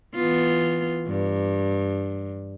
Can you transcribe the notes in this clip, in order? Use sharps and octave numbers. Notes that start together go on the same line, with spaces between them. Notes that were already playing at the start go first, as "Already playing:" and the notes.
E3 B3 F4
G2